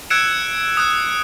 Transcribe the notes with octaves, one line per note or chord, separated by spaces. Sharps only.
E6 F#6 G#6 C#7 D7 E7
D#6 F#6